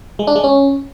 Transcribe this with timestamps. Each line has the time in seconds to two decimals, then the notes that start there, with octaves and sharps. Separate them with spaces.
0.19 G#3
0.27 D4
0.35 G#3
0.44 C#4